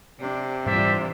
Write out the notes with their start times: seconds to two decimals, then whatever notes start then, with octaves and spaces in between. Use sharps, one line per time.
0.21 C3 D4
0.66 G#2 E3 G3 D4 F4 C5 D5 E5